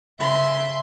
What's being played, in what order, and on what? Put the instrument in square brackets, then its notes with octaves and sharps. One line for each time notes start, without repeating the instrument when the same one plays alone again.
[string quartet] C#3 E5 C6